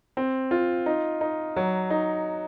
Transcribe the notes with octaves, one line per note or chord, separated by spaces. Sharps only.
C4
F4
D#4
D#4
F#3
D#4